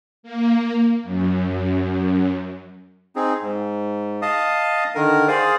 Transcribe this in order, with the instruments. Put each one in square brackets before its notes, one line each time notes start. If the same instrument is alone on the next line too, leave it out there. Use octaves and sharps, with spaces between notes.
[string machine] A#3
F#2
[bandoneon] C4 D#4 G#4
G#2
D#5 F5 A5 D#6
D3 D#3 A#4
G#4 C5 D5 F5 D#6